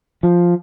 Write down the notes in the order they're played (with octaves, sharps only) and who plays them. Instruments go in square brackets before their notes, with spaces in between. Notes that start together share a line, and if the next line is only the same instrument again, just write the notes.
[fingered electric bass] F3